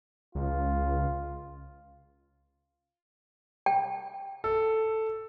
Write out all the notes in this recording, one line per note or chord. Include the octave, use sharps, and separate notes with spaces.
C#2 F4
G5
A4